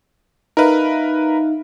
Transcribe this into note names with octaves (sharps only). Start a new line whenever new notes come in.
D#4 A#4 B4 E5 F5